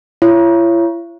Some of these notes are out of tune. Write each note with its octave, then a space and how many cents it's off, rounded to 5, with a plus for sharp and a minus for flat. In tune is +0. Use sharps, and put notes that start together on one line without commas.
E4 +45 C#5 +0